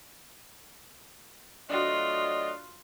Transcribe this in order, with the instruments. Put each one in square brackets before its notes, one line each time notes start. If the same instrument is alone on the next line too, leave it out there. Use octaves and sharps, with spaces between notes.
[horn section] F#3 A3 D#5 [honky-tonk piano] D4 F#4 [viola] F4